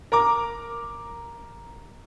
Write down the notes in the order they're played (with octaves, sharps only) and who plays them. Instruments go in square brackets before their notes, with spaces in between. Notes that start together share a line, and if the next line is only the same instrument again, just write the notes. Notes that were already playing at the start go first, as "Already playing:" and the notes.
[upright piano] A#4 A#5 D6